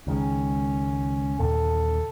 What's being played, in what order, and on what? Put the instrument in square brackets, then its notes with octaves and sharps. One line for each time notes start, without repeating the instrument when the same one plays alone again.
[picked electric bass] C#2 D#3 G#3 [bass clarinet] C#4
[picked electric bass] D#2 A#2 D3 [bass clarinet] A4